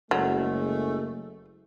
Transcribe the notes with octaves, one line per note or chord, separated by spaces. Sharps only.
F#1 F#3 G#3 A3